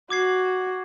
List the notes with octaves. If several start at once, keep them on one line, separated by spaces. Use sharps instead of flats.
F#4 D6 G#6 C7